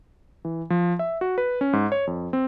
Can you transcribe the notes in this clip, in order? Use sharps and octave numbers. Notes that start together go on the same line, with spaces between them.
E3
F3
E5
F#4
B4
C#4
G#2
C#5
F2
C4